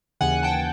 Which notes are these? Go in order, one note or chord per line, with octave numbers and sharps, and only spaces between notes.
D#2 C#3 E3 F#5 G#5
G5 A5